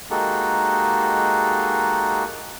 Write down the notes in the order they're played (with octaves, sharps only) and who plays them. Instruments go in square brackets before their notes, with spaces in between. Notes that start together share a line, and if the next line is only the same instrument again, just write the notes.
[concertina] G#3 A#3 D#4 F#4 G4 A4